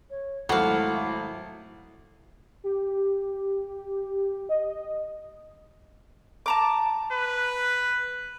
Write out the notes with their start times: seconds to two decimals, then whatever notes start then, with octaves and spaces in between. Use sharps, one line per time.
0.10 C#5
0.49 G#1 F#3 A3 E4 F#4 A4 F5
2.64 G4
4.49 D#5
6.46 A5 A#5 D6
7.12 B4